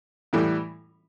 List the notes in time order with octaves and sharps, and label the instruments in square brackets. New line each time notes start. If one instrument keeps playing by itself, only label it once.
[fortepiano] A2 E3 G3